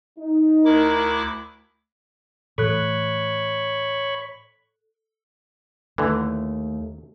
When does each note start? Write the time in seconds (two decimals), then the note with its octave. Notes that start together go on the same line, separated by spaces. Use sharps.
0.19 D#4
0.65 D2 E4 A#4 D6
2.58 A2 E3 A3 A4 C#5 B5 C#6 F#6
5.98 D#2 D3 E3 A3